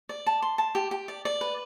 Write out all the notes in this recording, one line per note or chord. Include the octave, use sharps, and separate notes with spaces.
D5
A5
C6
A5
G4
G4
D5
D5
B4